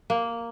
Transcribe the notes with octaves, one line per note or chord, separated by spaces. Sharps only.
A#3